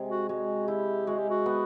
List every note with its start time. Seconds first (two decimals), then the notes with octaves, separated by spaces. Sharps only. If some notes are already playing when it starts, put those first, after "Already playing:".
Already playing: C3 G#3
0.09 F#4
0.29 G#3 F#4
0.67 E4 G4
1.07 G#3 F#4
1.19 G4
1.30 F#4
1.46 B3